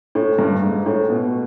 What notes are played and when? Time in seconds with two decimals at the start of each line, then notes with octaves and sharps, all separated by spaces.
0.15 A2
0.39 G2
0.62 G#2
0.86 A2
1.10 B2